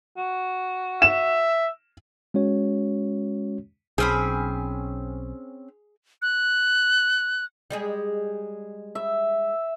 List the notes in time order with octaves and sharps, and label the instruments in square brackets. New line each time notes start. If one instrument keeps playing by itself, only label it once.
[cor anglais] F#4
[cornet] E5 [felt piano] E7
[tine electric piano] G#3 C#4 F#4 C#5
[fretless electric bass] B1 [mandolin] C4 C#4 B5 [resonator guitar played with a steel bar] G#4
[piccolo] F#6
[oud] G3 G#3 G#4
[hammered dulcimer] E5